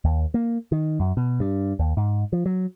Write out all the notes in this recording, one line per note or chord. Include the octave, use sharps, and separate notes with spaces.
D#2
A#3
D#3
F#2
B2
G2
D#2
G#2
F3
F#3